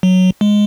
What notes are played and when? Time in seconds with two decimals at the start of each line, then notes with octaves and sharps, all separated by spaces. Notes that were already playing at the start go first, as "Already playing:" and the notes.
0.03 F#3
0.41 G#3